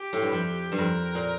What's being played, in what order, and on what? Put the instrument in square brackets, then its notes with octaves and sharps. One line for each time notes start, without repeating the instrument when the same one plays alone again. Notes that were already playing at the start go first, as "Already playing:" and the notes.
Already playing: [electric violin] G4
[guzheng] A2
G2
F2
G2
[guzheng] F2 [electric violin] A#4
[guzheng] A#2